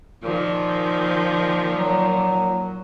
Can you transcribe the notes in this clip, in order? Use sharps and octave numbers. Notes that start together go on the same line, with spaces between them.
A#2 D#3 F3
F#3